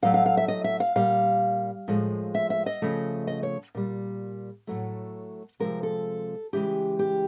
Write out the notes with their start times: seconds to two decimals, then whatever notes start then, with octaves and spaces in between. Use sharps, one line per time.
0.02 A2 F#3 A3 F5
0.14 F5
0.26 F5
0.37 E5
0.48 D#5
0.64 E5
0.80 F5
0.96 A#2 G3 F5
1.88 A2 F3 G#3
2.35 E5
2.50 E5
2.66 D#5
2.82 C#3 F3 A3
3.27 D#5
3.43 C#5
3.75 A#2 G3
4.67 A2 F#3 A3
5.60 C3 F3 G#3 A#4
5.83 A4
6.53 C#3 E3 G#3 G4
6.99 G4